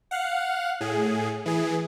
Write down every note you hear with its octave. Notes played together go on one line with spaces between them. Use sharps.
F5 F#5
A2 G#4
E3 G#4